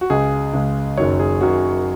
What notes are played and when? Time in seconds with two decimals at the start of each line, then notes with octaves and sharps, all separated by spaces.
0.01 F#4
0.10 C#2 C#3 G#3 G#4
0.54 C#2 C#3 G#3
0.97 F#1 F#2 D#3 F#3 C#5
1.19 G#4
1.41 F#1 F#2 D#3 F#3 F#4